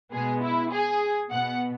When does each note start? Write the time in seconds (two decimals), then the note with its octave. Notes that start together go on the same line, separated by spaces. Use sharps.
0.12 B2 G#3 B3 G#4
0.42 E4
0.72 G#4
1.31 B2 B3 F#5